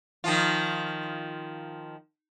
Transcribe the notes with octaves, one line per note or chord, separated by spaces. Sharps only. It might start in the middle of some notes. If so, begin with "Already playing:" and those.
D#3 F3 F4